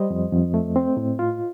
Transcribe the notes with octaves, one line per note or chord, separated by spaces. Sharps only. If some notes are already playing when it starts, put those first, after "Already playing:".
Already playing: G3 C5 D#5
F2
F2
A3
C4
A2
F4